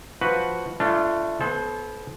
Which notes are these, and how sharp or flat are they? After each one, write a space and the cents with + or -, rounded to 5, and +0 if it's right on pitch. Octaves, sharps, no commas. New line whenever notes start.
F3 +0 F#4 +0 B4 +0
A3 +0 D4 +5 F4 -30
B3 +0 A4 -35 C5 +15